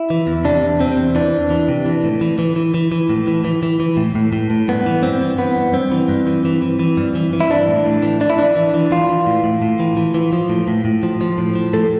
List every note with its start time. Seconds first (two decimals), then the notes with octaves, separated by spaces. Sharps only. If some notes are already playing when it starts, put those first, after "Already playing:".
Already playing: E4
0.10 E3
0.27 E2
0.45 C3 D4
0.62 E2
0.80 C3 C4
0.97 E2
1.15 E3 D4
1.33 E2
1.50 E3
1.69 C3
1.86 E3
2.04 A2
2.21 E3
2.39 E3
2.56 E3
2.74 E3
2.92 E3
3.10 A2
3.27 E3
3.45 E3
3.63 E3
3.80 E3
3.97 A2
4.15 A2
4.33 A2
4.50 A2
4.68 G2 B3
4.86 E3
5.03 G2 C4
5.21 E3
5.38 E3 B3
5.56 G2
5.73 G2 C4
5.92 E3
6.09 G2
6.27 E3
6.45 E3
6.62 E3
6.79 E3
6.97 G2
7.15 E3
7.33 E3
7.40 E4
7.50 E3 D4
7.68 A2
7.86 A2
8.02 E3
8.20 E3 D4
8.30 E4
8.38 E3 D4
8.56 E3
8.74 E3
8.91 E3 F4
9.09 E3
9.27 A2
9.44 A2
9.62 A2
9.80 E3
9.97 E3
10.15 E3
10.33 F3
10.49 A2
10.68 A2
10.85 A2
11.03 F3
11.21 F3
11.38 A2
11.55 F3
11.73 A2 A4